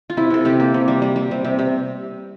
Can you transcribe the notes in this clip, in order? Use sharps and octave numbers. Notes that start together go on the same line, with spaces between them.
F4
C3 E4
C3 A4
C3 G4
A#3
C3
G3
G3
G3
C3
C3
C3